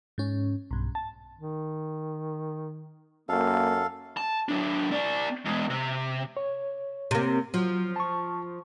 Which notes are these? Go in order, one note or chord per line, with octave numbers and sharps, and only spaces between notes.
G#2 C#4
B1 G2
A5
D#3
F#2 A#3 A4 F5
A5
F#3 D4
C4 D5
E2 G#3
C3
C#5
C3 A#3
F3 F#3
A5 C#6